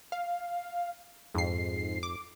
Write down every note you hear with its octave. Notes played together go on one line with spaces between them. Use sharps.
F5
F2 G#2 C7
D6